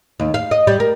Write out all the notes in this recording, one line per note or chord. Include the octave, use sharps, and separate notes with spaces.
D#2
F5
D#5
G3
A#4